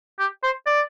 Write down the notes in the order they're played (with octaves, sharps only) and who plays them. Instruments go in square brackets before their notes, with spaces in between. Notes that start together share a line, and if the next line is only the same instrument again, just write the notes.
[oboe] G4
C5
D5